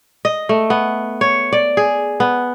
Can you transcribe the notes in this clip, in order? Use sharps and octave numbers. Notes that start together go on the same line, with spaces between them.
D#5
A3
B3
C#5
D5
G#4
B3